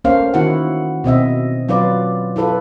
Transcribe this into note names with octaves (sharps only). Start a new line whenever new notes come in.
A3 A#3 C#4 C5 F5
D#3 A#3 E4 F#4 F#5
B2 C4 D#5 E5
F#3 F4 B4 D5
E4 F4 A4 B4